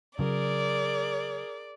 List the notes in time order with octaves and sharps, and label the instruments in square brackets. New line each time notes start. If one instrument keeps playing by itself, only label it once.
[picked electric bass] C#3 F#3 [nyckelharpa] G#4 A#4 [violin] D5